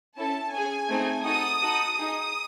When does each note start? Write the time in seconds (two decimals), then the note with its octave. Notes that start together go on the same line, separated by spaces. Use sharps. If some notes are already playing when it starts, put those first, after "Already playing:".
0.17 C#4 E4 A4 A5
0.53 C#4 G#4 G#5
0.89 A3 C4 D#4 G#4
1.25 D#4 F#4 A4 D#6
1.62 D#4 F#4 A4
1.97 D#4 G#4 D#6